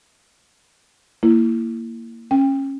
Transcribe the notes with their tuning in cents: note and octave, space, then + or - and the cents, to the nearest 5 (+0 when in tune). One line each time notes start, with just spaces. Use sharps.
A#3 -15 E4 +15
C#4 -20 G5 +25